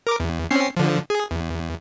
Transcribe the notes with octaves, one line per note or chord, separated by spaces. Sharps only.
A#4 D6
E2
C4 C#4 C7
D3 F3
G#4
E2